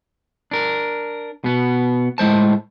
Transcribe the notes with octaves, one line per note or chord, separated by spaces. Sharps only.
D4 A#4
B2 B3
A2 G#3 C5 A5